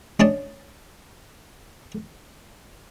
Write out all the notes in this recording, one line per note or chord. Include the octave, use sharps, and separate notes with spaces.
C#4 D4 D#5 A5